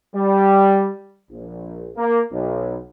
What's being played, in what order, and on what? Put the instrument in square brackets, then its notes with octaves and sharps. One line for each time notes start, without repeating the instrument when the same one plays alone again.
[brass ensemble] G3
A#1
A#3
B1